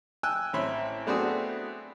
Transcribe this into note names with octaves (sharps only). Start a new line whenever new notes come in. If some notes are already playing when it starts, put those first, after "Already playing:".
G5 G#5 E6 F#6
A1 C4 C#5 E5 B5 C6
A3 B3 C4 D4 F#4 G#4